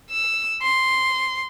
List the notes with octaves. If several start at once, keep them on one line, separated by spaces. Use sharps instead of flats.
E6
C6